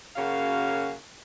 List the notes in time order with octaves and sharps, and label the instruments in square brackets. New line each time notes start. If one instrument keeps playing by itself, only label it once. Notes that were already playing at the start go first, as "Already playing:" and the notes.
[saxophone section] F#2 C#3 A#3 C#4 F#4 F5